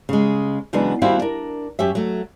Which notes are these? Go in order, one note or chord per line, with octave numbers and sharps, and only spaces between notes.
C#3 G#3
C#3 E3 F#3 G#3 B3 D4
D#2 G3 C4 E4 F#4 F5
D4 A#4
F#2 G4 C#5 E5
F#3 A3